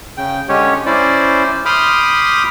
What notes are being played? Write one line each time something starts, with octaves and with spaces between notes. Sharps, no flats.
C#3 G5
D3 G#3 C#4 G4 C#5
C#4 E4 C5 D5
B5 C6 D6 D#6 F6 G6